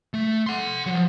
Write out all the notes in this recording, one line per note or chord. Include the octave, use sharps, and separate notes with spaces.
A3
F#5 C6
F3 F#3